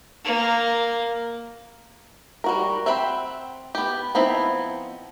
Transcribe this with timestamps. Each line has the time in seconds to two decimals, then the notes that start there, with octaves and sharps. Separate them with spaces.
0.24 A#3
2.44 G3 F#4 A#4
2.86 C4 E5 F#5 G5 B5
3.75 B3 G4
4.15 F3 B3 C4 D#4 E4